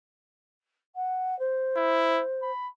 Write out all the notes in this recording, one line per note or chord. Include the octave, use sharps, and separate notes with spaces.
F#5
C5
E4
B5